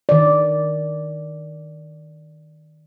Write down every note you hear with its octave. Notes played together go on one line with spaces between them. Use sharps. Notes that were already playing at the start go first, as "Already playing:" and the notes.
D#3 D5